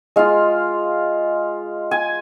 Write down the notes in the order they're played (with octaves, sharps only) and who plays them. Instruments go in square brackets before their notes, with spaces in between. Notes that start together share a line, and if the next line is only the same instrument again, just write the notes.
[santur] G#3 F4 F5
G#5